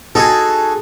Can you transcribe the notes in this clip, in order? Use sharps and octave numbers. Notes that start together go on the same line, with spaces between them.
D#4 F#4 G#4 A4